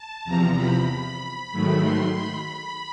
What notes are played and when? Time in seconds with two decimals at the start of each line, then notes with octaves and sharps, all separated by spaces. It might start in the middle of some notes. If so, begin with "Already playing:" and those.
Already playing: A5
0.24 E2 C3 F3 A#5
0.56 B5
1.51 G#2 D#3 F#3 A3
1.82 C6
2.15 B5